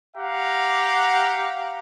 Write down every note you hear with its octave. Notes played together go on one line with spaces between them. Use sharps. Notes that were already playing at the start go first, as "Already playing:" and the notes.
G4 F5 F#5 A#5